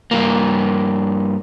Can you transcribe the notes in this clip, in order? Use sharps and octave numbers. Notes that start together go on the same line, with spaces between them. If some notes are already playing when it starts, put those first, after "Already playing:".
G2 A#3